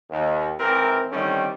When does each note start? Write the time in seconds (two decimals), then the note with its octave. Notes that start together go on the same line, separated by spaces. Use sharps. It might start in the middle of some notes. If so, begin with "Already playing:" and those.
0.10 D#2
0.60 G#1 E3 C4 E4 A#4
1.12 D3 D#3 G3 A3 C4 C#4